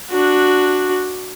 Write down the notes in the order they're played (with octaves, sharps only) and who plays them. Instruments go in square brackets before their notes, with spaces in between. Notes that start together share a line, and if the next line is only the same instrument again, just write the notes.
[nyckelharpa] D4 F#4